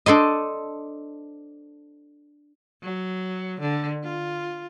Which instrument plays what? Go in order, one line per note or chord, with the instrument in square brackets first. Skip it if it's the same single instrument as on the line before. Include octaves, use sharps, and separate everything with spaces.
[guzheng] D4 A4 C5 D#5
[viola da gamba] F#3
D3
F4